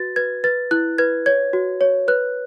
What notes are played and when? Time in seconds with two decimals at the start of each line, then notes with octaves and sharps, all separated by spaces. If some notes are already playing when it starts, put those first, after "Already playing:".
Already playing: F#4 B4 A6
0.16 B4 G#6
0.44 B4 A6
0.71 E4 F#6
0.98 B4 G#6
1.26 C#5 G#6
1.53 F#4
1.81 C#5
2.08 B4 F#6